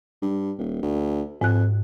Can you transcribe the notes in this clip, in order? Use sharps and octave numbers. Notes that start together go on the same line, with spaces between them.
G2
D#1
D2
F2 G#2 F#6